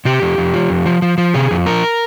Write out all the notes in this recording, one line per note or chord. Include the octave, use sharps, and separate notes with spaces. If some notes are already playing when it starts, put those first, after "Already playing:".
C3 G4
F2
F2
F3
F2
F3
F3
F3
C3 G#4
F2
F3 A#4